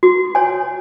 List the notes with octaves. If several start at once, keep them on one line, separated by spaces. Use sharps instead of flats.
F#4
C#5 G#5